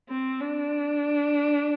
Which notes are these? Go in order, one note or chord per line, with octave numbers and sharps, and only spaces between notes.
C4
D4